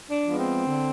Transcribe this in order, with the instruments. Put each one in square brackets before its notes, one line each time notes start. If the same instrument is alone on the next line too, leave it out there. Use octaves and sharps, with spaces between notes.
[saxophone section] D4
F3 G#3 B3
C4
D3